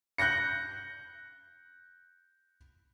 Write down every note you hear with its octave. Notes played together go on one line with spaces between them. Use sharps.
F#6 G6 A#6 C#7